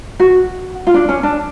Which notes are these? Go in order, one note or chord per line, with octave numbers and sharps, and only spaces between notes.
F#4
F4
D4
C#4
D4